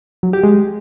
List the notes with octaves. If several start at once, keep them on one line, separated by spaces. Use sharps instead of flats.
F#3
G4
G#3